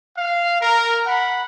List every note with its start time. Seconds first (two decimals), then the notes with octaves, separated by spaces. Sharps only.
0.18 F5
0.61 A#4
1.07 F#5 B5